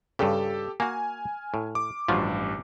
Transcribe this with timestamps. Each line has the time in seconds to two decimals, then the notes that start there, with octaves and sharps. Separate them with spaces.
0.19 G2 C#3 G4 A4
0.80 A#3 F#4 G#5 F6
1.54 A2
1.75 D6
2.08 A1 G2 F3 F#3 F4